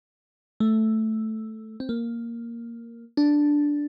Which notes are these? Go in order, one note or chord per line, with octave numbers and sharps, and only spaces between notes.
A3
C4
A#3
D4